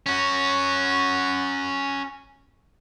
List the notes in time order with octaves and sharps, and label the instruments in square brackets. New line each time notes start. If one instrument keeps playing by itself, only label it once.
[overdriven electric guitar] C#4 F#4